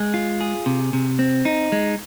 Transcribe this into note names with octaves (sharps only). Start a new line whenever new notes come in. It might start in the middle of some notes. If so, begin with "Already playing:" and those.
Already playing: G#3 G#4
F4
G#4
C3
C3
C4
D#4
G#3